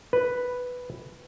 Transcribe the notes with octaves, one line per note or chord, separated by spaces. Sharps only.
B4